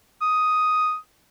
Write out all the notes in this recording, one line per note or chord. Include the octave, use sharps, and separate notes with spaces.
D#6